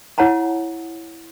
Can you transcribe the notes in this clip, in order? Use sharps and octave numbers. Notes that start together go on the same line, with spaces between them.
E4 C#5 F#5 A5 A#5